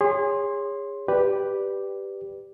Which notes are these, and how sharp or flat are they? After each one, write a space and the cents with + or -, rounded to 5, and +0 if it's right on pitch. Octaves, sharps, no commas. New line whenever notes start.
G#4 -30 C#5 +0 C6 +10
G4 +0 B4 +0 D5 +0